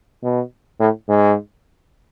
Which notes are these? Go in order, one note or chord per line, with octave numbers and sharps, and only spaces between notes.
B2
A2
G#2